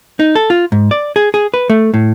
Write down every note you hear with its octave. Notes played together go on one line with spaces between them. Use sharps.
D#4
A4
F4
G#2
D5
G#4
G#4
B4
A3
A2